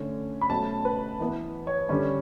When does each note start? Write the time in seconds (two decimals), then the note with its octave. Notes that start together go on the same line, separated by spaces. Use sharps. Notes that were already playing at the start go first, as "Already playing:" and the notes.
Already playing: D3 A3 C#4
0.41 B5
0.50 B2 F#3 A3 C#4 A5
0.85 B4
1.20 E3 B3
1.67 C#5
1.89 D3 G3 C#4